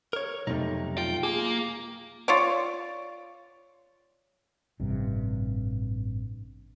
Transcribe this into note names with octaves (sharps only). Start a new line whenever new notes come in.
A#4 C#5
B1 F2 C3 A3 D#4
F4 G5
A#3 G#4
F4 C#5 D5
A1 G2 C3